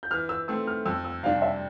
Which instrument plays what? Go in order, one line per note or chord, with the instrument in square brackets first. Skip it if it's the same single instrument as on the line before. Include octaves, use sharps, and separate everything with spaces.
[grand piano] G6
[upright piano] E3 [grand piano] F6
[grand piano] E6
[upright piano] A3 C4 [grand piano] E6
[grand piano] F6
[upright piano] F2 [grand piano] E6
[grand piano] E6
[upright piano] C3 G3 D4 [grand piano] F5
[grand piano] E5